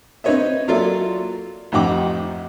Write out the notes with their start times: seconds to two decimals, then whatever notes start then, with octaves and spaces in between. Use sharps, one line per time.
0.24 C4 D#4 B4 C#5 D#5 E5
0.68 F#3 A#3 F4 A4 D5 E5
1.72 A1 F2 D#4 F#5 G5 D6